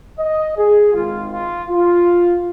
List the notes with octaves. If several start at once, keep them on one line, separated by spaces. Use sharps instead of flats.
D#5
G#4
G#1 G#2 D#3 F4
F4
F4